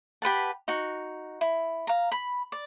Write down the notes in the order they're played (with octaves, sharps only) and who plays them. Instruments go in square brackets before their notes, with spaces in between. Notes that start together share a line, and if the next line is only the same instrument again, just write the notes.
[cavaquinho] G4 B4 F#5 A5
D#4 F#4
E4
F5 A#5
B5
D5